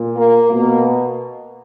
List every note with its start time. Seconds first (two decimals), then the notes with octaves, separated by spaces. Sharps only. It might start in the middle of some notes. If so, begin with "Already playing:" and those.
Already playing: A#2
0.17 A#3
0.51 B2 A#3